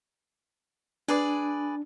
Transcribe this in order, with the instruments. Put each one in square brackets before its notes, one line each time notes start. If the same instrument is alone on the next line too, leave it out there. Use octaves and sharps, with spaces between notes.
[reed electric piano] D4 [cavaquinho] G#4 B4 D5